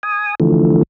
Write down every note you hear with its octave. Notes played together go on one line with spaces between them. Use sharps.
G#5 D#6
D3 E3 F3 A3